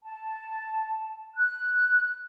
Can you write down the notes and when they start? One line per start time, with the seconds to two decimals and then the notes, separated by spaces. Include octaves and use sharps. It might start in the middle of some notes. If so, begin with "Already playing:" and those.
0.03 A5
1.35 F#6